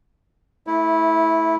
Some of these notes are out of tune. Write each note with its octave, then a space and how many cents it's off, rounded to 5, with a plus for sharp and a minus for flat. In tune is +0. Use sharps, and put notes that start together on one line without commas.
A3 +0 E4 -15